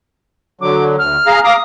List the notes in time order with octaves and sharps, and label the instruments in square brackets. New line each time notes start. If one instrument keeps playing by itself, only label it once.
[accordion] D3 F#3 [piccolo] D6
[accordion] D2 [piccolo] F6
[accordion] G#4 F5 A#5
[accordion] F5 A#5 D6 [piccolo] D#6